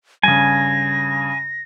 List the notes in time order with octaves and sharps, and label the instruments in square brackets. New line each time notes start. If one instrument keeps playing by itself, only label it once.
[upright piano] G2 C#3 [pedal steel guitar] G#5 [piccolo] A#6